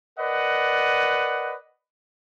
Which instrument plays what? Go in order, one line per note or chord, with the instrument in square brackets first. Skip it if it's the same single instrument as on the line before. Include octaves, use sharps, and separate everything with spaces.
[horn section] A#4 B4 D5 D#5 F#5